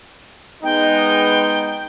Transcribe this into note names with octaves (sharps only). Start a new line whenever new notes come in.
G#3 B3 D#4 G5